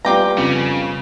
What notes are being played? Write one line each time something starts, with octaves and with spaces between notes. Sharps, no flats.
G3 B3 F4 G4 D5 A#5
F2 C#3